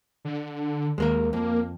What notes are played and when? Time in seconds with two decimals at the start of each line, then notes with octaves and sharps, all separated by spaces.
0.25 D3
0.98 D#2 G#3 A#3 A#4
1.33 F2 A#3